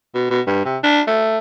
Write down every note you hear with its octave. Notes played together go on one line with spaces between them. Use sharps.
B2
B2
G2
C3
D4
A3